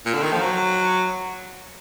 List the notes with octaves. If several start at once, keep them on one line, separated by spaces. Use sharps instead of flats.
A#2
D3
D#3
F3
F#3